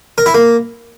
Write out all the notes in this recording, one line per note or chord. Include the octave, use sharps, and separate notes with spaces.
A#4
E4
A#3